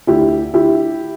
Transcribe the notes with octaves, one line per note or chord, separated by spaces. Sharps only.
D2 E4 G4
D3 E4 G4